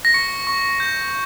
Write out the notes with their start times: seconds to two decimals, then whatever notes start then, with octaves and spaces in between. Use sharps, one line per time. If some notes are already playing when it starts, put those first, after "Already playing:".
0.05 A#6
0.14 C#6 C#7
0.47 C#6
0.80 G6